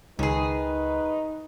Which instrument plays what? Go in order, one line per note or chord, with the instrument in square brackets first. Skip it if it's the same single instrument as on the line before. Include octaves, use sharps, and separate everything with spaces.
[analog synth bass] C#2 [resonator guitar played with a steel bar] D#3 G#4 [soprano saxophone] D#4 [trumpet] B4